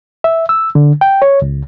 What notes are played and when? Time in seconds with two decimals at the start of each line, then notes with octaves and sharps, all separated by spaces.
0.24 E5
0.49 E6
0.75 D3
1.01 G5
1.22 C#5
1.42 C#2